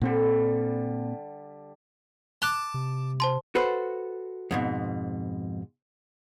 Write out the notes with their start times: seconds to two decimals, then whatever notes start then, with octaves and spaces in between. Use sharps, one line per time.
0.02 A#2 D3 G3 C4
2.42 A5 D6 F#6 F7 G7
2.74 C3
3.20 C5 A5 C6
3.55 F#4 A4 B4 C5
4.51 F2 G#2 B2